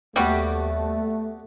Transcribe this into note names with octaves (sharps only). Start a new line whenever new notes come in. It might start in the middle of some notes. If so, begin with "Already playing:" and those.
D#2 G3 A3 B3 F#4 G4